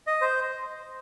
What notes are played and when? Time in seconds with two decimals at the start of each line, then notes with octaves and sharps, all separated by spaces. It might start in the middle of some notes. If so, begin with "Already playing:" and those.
0.07 D#5
0.21 C5